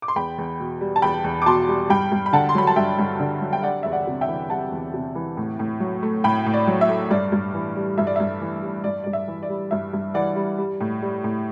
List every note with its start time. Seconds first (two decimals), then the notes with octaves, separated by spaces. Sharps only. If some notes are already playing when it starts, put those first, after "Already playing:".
0.02 D6
0.08 C6
0.16 E2 G5 B5
0.38 E2
0.60 B2
0.81 G3
0.96 A5
1.02 E2 G5 B5
1.24 E2
1.42 D6
1.46 B2 A5 C6
1.68 G3
1.89 G2 G5 B5
2.12 G2
2.26 B5
2.33 D3 F#5 A5
2.49 C6
2.55 F#3 B5
2.67 A5
2.76 G2 E5 G5
2.99 G2
3.20 D3
3.41 F#3
3.53 G5
3.63 G3 D5 F#5
3.83 E2 E5
3.92 D5 F#5
4.07 C3
4.21 E5 G5
4.28 E3
4.50 G3 F#5 A5
4.72 E2
4.94 C3
5.15 E3
5.37 A2
5.59 A2
5.80 F#3
6.03 A3
6.24 A2 G5 B5
6.46 A2
6.53 D5
6.67 F#3
6.81 E5
6.89 A3
7.11 G2 D5
7.32 G2
7.54 E3
7.76 G3
7.98 G2 E5
8.07 D5
8.16 G2 E5
8.41 E3
8.63 G3
8.84 G2 D5
9.04 D5
9.06 G2
9.13 E5
9.28 E3
9.43 D5
9.49 G3
9.71 G2 E5
9.93 G2
10.14 E3 D5 F#5
10.36 G3
10.58 G3
10.80 A2
11.02 G3
11.24 A2